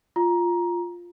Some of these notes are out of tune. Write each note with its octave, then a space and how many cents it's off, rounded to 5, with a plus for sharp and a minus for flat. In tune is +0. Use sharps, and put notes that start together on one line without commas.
F4 +0 A#5 +15